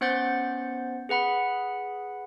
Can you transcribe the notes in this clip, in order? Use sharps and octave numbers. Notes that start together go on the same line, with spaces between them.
B3 C#4 C5 F#5 G6 A6
G#4 B4 F#5 B5